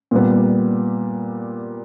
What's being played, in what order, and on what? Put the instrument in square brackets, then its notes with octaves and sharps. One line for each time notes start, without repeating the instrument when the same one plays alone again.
[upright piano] A#2 G3 B3